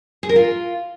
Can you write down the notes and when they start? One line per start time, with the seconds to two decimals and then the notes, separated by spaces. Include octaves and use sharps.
0.23 G#4
0.29 A#4
0.36 F4